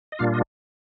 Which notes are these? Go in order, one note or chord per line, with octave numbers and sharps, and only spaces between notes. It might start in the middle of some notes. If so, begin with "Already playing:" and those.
D#5
A#2 G3 A#3 D4 F4 F5
D#5